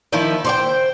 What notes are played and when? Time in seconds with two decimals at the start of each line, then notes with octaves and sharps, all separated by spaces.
0.12 D#3 F3 E4
0.45 C5 D5 G5